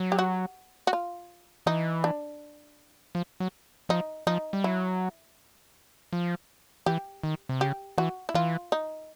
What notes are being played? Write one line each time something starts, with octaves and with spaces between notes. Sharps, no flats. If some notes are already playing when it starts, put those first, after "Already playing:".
Already playing: F#3
G4
F#4
F#4
F4
E3 D#4
D4
F3
F#3
F3 D#4
F3 D#4
G3
F#3 E4
F3
E3 G4
D#3
C3
C#3 G4
E3 F#4
E4
E3 F4
D#4